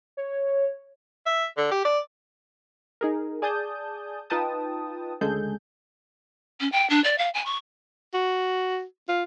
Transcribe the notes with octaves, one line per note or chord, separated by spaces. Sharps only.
C#5
E5
D3
G4
D5
D#4 G#4 A#4
G#4 D5 G#5 A5 D#6 G6
D#4 F4 B4 G5 A5 D#6
D2 C#3 G#3 G#4 A4 G6
C#4
G5
D4
D5
F5
G#5
C#6
F#4
F4